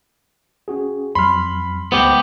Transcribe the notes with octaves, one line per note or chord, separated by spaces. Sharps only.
C#4 F#4 G#4
F2 F#3 B5 C6 F6
C#2 G#3 B3 G4 C5